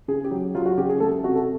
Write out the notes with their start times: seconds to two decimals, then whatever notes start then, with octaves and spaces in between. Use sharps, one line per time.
0.08 C#3 G#4
0.24 G4
0.31 F#3
0.55 F#3 F4
0.66 F#4
0.77 C#3 G4
0.89 G#4
1.00 A3 A4
1.24 C3 F#4
1.35 A4